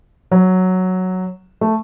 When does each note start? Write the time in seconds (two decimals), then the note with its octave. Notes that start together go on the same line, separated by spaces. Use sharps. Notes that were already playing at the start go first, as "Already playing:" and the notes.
0.31 F#3
1.61 A3